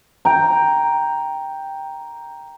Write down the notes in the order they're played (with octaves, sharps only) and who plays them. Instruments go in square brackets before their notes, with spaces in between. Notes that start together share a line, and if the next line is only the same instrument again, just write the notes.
[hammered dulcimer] G5 A#5